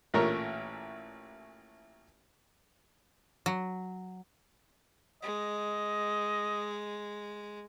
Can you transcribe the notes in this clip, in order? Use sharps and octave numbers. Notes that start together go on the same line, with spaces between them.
A1 A#2 A3 A#4 C#5
F#3
G#3 D#5